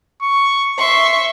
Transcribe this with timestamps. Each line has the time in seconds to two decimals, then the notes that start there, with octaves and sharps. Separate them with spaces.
0.22 C#6
0.78 E5 C6 C#6